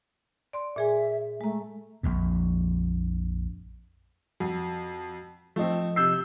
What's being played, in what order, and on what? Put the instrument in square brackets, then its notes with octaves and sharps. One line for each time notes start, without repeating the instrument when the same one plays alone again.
[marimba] D5 C6
[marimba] A#2 G#4 G#5 [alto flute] E5
[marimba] G#3 A#5 [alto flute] A3
[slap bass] A#1 F2 A#2
[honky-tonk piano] F2 [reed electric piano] F#4
[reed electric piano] F3 F4 D#5 [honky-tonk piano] A3 C4
[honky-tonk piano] C3 G6 C7 [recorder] E6